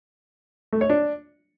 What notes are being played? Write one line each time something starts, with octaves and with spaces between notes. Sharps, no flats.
A3
C#5
D4